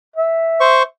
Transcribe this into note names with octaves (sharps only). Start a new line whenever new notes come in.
E5
C5 C#6